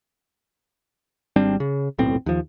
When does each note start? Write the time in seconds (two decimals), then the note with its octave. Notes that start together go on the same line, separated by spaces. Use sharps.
1.36 G#1 G3 C4 D4
1.60 C#3
1.98 D#1 B1 A2 C4
2.26 D#2 F3